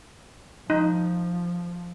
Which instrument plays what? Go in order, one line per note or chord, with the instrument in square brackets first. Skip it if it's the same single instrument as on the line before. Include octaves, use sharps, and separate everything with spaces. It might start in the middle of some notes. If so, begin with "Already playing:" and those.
[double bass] F3 [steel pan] D#4